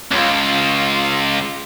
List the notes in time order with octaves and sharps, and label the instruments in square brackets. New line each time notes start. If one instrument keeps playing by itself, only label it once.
[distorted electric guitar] C#2 [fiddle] F4